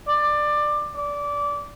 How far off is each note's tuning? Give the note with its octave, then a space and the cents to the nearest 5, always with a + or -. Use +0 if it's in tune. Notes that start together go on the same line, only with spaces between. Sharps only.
D5 +20
D5 -20